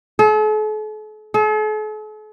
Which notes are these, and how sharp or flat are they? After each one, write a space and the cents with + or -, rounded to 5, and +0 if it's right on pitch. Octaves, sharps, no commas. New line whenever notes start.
A4 -45
A4 -45